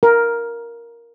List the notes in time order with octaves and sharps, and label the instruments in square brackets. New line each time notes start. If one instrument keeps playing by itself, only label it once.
[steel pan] A#4